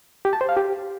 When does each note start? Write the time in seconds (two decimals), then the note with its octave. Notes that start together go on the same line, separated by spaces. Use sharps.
0.25 G4
0.33 A5
0.41 C5
0.49 F5
0.57 G4